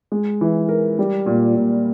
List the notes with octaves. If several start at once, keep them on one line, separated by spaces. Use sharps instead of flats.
G#3
E3
A#4
G3
A#2
A#2